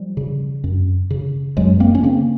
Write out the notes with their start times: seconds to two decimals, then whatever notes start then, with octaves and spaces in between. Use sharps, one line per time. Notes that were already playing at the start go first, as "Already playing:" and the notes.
Already playing: F3 G3
0.17 C#3
0.64 F#2
1.11 C#3
1.57 F#2 F#3 G#3
1.80 A#3 C4
1.95 C#4
2.03 C#3 A#3 C4